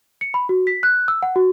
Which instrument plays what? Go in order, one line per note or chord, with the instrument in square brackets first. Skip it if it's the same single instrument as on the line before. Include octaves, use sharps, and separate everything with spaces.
[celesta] C#7
B5
F#4
B6
F#6
E6
F#5
F#4